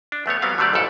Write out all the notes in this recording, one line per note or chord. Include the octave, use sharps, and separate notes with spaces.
D4
E2 A3 B3 C#5
F#3 G3 B3 C4 F5
D3 F#3 G3 A3 D5
A1 F2 G#2 A4 D5